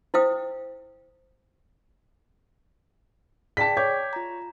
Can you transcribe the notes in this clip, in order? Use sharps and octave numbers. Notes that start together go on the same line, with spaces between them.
E4 C5 D#5 F5 G5 D#6
G#4 D5 G5 A5 B6
C#5 D6 G6 G#6
F4 A#5